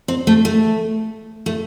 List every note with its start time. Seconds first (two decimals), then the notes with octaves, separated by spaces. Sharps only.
0.08 C4
0.27 A3
0.45 A3
1.46 A3